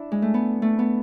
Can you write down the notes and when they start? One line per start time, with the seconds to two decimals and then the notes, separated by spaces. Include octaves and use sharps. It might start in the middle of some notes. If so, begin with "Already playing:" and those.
Already playing: D4 E4
0.12 G#3
0.22 A3
0.34 B3
0.62 A3
0.79 B3